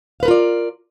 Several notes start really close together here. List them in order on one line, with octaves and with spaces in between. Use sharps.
F5 B4 A#4 F4 D5